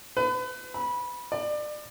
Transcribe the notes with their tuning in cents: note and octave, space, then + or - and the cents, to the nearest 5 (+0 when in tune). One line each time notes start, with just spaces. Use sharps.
B4 +35
B5 -20
D5 +30